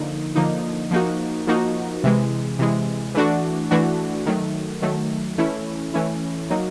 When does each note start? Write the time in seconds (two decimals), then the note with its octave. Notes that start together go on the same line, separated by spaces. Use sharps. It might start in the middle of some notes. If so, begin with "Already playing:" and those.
Already playing: D3 F3 A#3 D#4
0.35 D3 F3 A#3 D#4
0.91 F3 A#3 D#4 F#4
1.47 F3 A#3 D#4 F#4
2.04 C3 E3 G#3
2.59 C3 E3 G#3
3.15 E3 A3 D4 F#4
3.71 E3 A3 D4 F#4
4.26 D#3 F#3 A3
4.82 D#3 F#3 A3
5.38 E3 A3 C#4 E4
5.94 E3 A3 C#4 E4
6.50 F#3 A#3 D#4 F#4